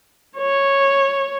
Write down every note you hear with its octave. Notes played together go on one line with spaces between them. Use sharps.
C#5